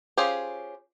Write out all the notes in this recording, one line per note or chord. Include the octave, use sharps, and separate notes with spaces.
C#4 F4 G4 G#4 C5